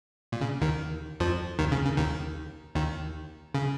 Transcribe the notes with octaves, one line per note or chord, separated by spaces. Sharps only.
A#2
C#3
D#2 D#3
F2 F3
D#2 D#3
C#3
C#3
D#2 D#3
D#2 D#3
C#3